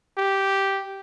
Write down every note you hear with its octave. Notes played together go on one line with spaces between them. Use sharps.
G4